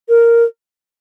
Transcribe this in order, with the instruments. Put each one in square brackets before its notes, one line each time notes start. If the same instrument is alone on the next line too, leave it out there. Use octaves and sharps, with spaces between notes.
[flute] A#4